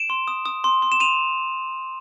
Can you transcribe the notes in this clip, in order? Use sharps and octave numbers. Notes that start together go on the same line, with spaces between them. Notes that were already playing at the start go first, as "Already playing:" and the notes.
Already playing: D7 E7
C6
D#6
D#6
C6
C6
E7
C6 D#7 F7